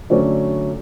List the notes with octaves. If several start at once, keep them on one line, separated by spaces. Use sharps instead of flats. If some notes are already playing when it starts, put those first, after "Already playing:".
D3 F#3 A3 C#4 D5